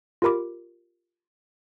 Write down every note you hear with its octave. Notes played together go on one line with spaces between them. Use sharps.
F4 G4 A#4 B5 D6